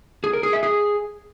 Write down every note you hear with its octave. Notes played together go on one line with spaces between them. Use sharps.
G#4
A#4
G#4
E5
G#4